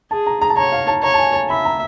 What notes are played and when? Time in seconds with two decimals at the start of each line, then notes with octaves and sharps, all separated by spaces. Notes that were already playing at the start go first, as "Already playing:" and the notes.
0.11 G#4 A5
0.27 A#5
0.41 A#5
0.50 A5
0.57 C#5 A#5
0.72 F5
0.88 A5
1.03 C#5 A#5
1.14 A5
1.18 G#5
1.34 A5
1.49 E5 B5
1.65 A#5